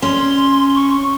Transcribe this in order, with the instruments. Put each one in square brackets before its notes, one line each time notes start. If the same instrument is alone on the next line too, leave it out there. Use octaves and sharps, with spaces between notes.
[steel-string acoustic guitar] C#4 [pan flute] C6
[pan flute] C#6